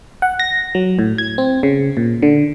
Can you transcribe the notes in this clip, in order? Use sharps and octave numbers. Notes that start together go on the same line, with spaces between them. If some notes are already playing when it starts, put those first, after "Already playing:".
F#5
A#6
F#3
A2
G#6
C4
C#3
A#2
D3